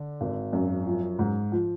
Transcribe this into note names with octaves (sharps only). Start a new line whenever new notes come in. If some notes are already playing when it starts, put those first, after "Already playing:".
Already playing: D3
G#1
F#2
F3
G#2
F3